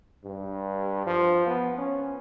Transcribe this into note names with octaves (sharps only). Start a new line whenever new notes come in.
G2
F3
B3
C#4